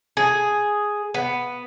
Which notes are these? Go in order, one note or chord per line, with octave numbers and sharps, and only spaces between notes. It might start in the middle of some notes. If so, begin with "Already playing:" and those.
G#4
B3